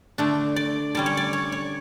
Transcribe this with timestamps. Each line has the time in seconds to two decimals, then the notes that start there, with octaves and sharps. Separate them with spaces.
0.18 D3 A3 D4
0.56 D5
0.95 D3 G3 C#4 D5
1.06 C#5
1.17 D5
1.33 C#5
1.52 C#5